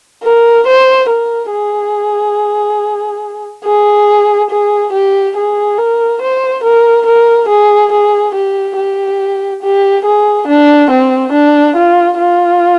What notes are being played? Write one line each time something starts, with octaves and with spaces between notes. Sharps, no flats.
A#4
C5
A#4
G#4
G#4
G#4
G4
G#4
A#4
C5
A#4
A#4
G#4
G#4
G4
G4
G4
G#4
D4
C4
D4
F4
F4